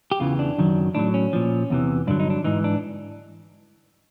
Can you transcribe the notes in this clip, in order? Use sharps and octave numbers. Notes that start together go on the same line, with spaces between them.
G4
E2 C#3 E3 F4
D4
F#2 D#3 F#3
A2 F#3 D4
C#4
A#2 F3
E2 C3 E3
G2 D3 F#3 D4
D#4
D4
G#2 E3 D#4
D4